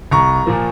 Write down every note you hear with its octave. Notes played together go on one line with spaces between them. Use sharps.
C2 A#5 C#6
A#2 F3 A#3